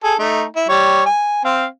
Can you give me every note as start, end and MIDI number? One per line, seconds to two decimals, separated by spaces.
0.04 0.14 68
0.04 0.14 69
0.19 0.44 57
0.19 0.44 63
0.56 0.64 64
0.69 1.04 55
0.69 1.04 73
1.06 1.40 80
1.45 1.66 60
1.45 1.66 77